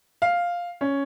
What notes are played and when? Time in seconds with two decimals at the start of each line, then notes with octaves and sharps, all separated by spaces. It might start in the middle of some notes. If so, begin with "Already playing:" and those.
0.22 F5
0.81 C#4